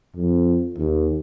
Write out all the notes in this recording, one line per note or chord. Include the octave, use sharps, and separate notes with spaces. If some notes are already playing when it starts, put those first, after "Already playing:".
F2
D#2